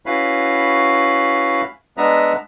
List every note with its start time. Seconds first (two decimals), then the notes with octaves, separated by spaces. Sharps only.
0.06 C#4 E4 F#4 B4 F5 B5
1.97 G#3 B3 D4 B4 E5 A#5